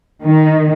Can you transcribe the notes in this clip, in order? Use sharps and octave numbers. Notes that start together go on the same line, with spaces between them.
D#3